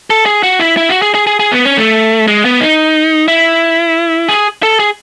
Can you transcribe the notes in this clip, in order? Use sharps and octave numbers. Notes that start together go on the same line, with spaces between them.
A4
G#4
F#4
E4
E4
F#4
G#4
G#4
G#4
G#4
B3
C#4
A3
G#3
B3
D#4
E4
G#4
A4
G#4